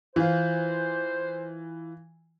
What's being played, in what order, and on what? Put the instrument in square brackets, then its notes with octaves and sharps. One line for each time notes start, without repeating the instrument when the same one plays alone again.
[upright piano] E3 F4 [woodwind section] C5